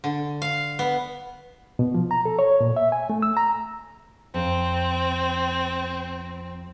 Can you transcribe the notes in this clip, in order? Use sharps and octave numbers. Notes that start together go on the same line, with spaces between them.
D3
F5
B3
B2
F3
A#5
A4
C#5
A#2
E5
G#5
A3
E6
A#5
F2 C4